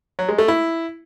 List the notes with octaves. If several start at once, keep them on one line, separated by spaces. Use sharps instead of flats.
F#3
G#3
A3
E4